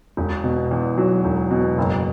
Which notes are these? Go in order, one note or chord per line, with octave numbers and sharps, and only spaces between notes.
E1
B2
E2
F#3
E1
B2
F#1